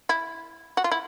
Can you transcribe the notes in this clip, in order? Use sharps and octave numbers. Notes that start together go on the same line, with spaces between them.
E4
F#4
F4
E4